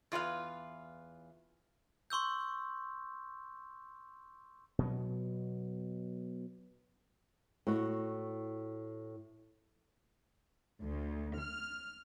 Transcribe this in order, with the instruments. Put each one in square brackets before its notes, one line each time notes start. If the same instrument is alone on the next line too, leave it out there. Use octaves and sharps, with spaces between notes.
[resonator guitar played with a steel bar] E2 F4 B4 F5
[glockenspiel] C6 C#6 E6 G6
[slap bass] B2 F#3 B3
[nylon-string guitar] A2 F#4
[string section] D2
F6